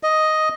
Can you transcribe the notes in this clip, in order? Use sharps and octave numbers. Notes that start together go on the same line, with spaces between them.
D#5